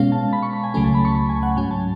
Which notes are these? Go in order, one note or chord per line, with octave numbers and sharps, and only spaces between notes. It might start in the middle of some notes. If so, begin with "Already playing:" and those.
Already playing: B2 G#3 C#4 F5
A5
B5
C#6
B5
G#5
C#2 C#3 F#3 A3 C#4 G#5
A5
B5
C#6
B5
G#5
F#5
G#2 F#3 C#4 G#5
A5